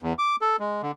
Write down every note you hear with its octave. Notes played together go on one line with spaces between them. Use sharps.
E2
D6
A4
G#3
D3